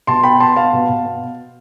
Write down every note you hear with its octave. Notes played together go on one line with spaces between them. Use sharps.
B2 A5 C6
B3 G5 B5
B3 A5 C6
B3 F5 A5
B2
B2
B3